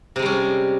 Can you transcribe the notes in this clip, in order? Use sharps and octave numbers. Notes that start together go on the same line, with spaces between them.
C3 G3 G#3 C#4